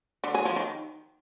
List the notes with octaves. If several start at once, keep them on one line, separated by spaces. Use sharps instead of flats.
D3
G#4
F3
D#3